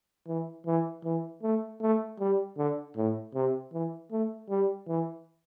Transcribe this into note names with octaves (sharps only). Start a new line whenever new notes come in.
E3
E3
E3
A3
A3
G3
D3
A2
C3
E3
A3
G3
E3